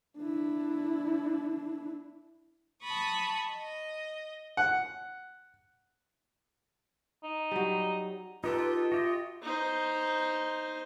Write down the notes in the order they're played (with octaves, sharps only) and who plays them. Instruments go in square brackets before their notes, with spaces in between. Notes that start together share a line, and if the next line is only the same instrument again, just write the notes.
[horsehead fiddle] D4 E4
[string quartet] A5 B5 C#6 D#6
D#5
[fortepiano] F#5
[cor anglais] D#4
[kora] F#3 G3
[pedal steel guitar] D#4 G4 A4 [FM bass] F4 [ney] B4
[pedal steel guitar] F#4 G4 D#5 [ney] E5
[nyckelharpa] D#4 C5